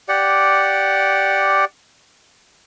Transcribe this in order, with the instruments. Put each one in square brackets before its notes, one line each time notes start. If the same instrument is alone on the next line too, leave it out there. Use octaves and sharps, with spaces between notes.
[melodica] G4 D5 F#5